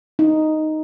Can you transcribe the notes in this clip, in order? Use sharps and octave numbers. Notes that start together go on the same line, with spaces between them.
D#4